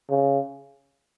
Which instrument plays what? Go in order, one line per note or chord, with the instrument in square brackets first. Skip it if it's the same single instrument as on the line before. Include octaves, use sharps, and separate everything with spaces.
[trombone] C#3